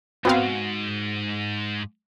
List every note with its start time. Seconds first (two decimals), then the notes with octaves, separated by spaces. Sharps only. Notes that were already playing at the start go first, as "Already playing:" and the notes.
0.25 G#2 B3 C4 F#4 F5